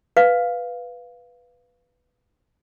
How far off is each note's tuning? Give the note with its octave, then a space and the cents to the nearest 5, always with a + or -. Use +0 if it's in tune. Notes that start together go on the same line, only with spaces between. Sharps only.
B4 +0 F5 +0